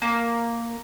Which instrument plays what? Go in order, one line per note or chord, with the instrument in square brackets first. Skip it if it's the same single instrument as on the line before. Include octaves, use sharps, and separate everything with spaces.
[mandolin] A#3